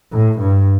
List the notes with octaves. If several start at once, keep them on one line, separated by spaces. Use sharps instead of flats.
A2
G2